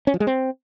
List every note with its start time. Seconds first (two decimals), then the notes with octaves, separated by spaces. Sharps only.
0.07 C#4
0.14 F3
0.20 G#3
0.27 C4